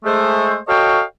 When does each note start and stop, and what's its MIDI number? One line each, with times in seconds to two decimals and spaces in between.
0.05 0.56 56
0.05 0.56 57
0.05 0.56 72
0.68 1.02 66
0.68 1.02 69
0.68 1.02 73
0.68 1.02 75
0.68 1.02 77
0.68 1.02 79